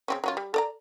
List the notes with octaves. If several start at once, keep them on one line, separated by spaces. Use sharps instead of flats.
C#3 C4 C#4
F#3 C#4 F4
G3
A4 D5 A#5